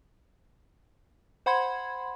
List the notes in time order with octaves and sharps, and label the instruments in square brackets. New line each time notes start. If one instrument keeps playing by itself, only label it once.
[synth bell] C5 F#5 B5 C6 G#6